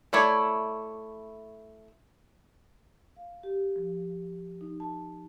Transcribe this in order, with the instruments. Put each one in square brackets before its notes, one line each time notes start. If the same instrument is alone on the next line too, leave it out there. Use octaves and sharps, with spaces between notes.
[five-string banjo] A3 E4 C#5 D5
[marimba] F5
G4
F3
D#4
A5